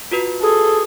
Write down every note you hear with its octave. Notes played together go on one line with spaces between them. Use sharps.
F4 F#4 B4
G#4 A4